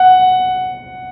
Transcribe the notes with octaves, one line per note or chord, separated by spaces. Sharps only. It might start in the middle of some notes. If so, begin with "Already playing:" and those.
Already playing: F#5